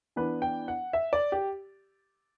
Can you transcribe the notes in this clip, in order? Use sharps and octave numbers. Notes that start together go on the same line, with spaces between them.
E3 B3 D4 B4
G5
F#5
E5
D5
G4